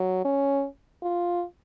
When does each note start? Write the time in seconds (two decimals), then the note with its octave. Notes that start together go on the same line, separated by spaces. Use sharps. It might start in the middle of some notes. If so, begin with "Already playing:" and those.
Already playing: F#3
0.25 C#4
1.03 F4